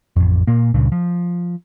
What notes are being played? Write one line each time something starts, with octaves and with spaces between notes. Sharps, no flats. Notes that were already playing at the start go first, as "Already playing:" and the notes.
A1 F2
A#2 A#3
C#2 G2 A#2 C#3
F3